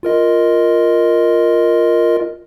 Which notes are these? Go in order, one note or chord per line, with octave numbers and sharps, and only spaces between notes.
F4 A#4 D#5